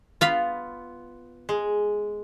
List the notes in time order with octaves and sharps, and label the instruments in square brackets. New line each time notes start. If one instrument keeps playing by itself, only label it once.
[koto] B3 [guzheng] F4 F5 B5
[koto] G#3